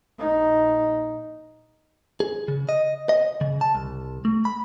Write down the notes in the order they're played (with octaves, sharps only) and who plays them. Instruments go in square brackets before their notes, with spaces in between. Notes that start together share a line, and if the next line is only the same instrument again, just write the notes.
[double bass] A#1 D#4
[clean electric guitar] G#4
C#3
D#5
D#5
C#3
A5
C2
A3
B5